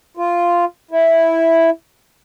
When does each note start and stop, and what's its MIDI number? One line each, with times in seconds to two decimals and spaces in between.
0.17 0.65 65
0.91 1.70 64